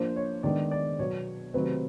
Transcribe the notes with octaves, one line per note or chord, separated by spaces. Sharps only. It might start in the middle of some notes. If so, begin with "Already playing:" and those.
Already playing: F3 A#3 D4 C5
C#5
D#3 G#3 B3 D4 D5
D5
B2 F#3 B3 C#5
C3 D#3 F#3 A3 C4 B4